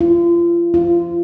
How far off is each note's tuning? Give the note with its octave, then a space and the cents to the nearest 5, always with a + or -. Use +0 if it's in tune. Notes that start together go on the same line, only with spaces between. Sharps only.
F4 -35
F4 -20